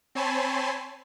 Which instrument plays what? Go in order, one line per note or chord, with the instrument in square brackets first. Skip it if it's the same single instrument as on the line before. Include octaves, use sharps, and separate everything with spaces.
[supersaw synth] C4 C#5 G#5 A5 B5 C6